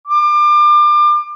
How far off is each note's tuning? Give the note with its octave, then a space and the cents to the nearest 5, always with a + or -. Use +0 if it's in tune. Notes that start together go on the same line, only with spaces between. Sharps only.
D6 +30